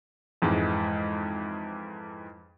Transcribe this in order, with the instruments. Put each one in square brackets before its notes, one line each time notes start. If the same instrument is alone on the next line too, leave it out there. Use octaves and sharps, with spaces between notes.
[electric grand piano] F2 G#2 E3 G#3